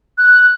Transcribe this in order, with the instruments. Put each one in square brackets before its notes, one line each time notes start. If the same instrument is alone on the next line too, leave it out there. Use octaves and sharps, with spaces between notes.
[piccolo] F#6